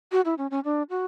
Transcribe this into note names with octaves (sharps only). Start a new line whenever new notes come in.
F#4
E4
C#4
C#4
D4
F#4